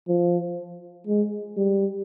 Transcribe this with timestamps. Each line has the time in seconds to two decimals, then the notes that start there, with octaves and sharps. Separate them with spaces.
0.08 F3
1.07 G#3
1.57 G3